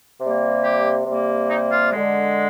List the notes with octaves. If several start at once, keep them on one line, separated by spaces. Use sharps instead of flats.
C3 G3 A#3
G4
C3 G3 A#3
D#4
F4
D3 G#3